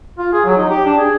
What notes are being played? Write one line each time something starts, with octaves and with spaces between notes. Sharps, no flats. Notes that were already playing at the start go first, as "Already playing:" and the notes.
F4
G#4
F#3
D#4
G4
D4
G#4